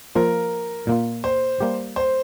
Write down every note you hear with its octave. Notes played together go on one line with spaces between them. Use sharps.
F3 A#3 F4 A#4
A#2 A#3 F4
C5
G3 A#3 G4
C5